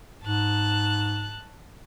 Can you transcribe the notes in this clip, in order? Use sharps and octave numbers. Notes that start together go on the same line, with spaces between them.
G#2 A5 F#6